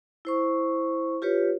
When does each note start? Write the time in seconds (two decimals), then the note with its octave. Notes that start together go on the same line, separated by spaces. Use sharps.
0.25 E4 C5 C#6
1.22 F4 G4 B4 C#5